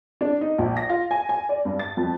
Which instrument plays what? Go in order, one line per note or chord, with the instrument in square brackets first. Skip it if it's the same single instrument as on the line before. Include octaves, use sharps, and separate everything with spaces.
[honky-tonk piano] D4
D#4
A#1
A#6
F4
G#5
G#5
D5
G2
A6
F2